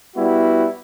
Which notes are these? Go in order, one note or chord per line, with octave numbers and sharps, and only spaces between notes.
G3 B3 E4 F#4